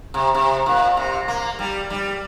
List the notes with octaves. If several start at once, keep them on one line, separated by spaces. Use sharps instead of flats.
C3
C3
A#2
C3
A#3
G3
G3